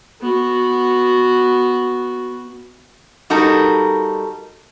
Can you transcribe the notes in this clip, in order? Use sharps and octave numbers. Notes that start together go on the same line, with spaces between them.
B3 F#4
G3 D#4 F#4 A4 A#4